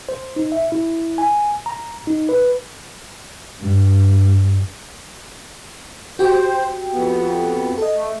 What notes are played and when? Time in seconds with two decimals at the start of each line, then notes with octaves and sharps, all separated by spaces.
0.09 C5
0.36 D#4
0.52 E5
0.72 E4
1.18 G#5
1.66 A#5
2.07 D#4
2.29 B4
3.61 G2
6.19 F#4 G4 C5 G5
6.93 F2 B3
7.78 A4 D#5
7.94 A3